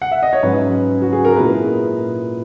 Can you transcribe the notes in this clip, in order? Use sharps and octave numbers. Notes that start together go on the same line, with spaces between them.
F#5
E5
D#5
C#5
G#2 F#3 C#4 B4
F#4
G#4
A#4
A#2 G#3 B3 E4 B4